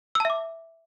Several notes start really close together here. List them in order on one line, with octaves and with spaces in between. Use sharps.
E6 A5 E5 D6